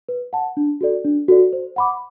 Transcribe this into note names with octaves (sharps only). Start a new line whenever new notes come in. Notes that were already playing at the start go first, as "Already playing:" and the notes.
B4
F#5 A5
D4
F#4 A4 D5
D4
F#4 A4 D5
C5
F#5 B5 D6